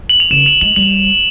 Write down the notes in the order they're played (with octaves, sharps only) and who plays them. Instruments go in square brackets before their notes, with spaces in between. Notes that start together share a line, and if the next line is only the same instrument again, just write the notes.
[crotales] F#7
F7
[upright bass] C#3 [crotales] E7
[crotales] F7
[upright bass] G#3 [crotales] F#7
[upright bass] G3 [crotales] F#7